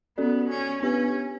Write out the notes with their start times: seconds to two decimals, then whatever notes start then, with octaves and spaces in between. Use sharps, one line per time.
0.18 B3 C#4 F#4 A4 D5
0.50 C#4
0.82 B3 C#4 D4 G4 B4